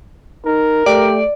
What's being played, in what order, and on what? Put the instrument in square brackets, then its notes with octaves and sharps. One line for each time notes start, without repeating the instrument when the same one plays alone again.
[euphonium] D#4 [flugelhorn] A#4
[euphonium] A3 [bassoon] G4 [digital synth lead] D5